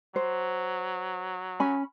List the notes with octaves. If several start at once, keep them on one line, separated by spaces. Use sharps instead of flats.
F#3 C5
C#4 G#5 B5